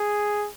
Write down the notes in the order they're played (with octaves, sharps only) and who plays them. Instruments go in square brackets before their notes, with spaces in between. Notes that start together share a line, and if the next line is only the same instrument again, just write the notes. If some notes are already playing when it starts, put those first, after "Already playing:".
Already playing: [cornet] G#4